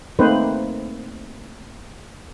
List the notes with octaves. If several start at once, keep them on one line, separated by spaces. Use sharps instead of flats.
A3 A#3 C4 D#4 B4 C5